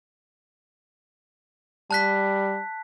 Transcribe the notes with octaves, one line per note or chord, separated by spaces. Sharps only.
G3 A5 F#6 B6